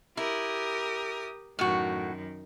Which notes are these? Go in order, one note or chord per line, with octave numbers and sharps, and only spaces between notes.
E4 G4 A#4 D#6
F#2 A2 D#3 F#4